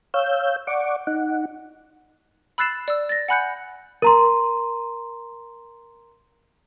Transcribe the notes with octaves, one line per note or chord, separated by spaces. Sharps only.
C#5 F5 E6 G6
D5 F#5 C#6 D6
D#4 F#5
B5 E6 F#6 A6 C7 E7
D5 E6
A6 A#6
F#5 G#5 B5 F#6 G6 C#7
A#4 A#5 C6